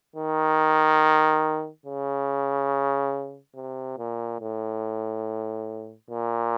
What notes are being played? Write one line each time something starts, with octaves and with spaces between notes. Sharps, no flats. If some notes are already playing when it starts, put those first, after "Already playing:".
D#3
C#3
C3
A#2
A2
A#2